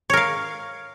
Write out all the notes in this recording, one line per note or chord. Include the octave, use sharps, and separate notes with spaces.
A#4 C#5 F5